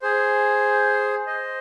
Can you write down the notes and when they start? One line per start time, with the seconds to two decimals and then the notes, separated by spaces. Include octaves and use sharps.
0.02 G#4 C5
1.27 C5 D#5